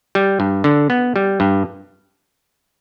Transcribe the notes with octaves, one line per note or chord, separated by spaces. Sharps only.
G3
G2
D3
B3
G3
G2